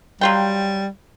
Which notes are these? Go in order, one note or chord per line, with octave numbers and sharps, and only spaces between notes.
F#3 G3 F4 G5